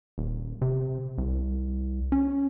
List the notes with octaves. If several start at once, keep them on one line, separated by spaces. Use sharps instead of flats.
D#1
C3
C2
C#4